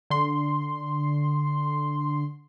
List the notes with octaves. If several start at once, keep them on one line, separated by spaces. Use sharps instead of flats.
D3 C6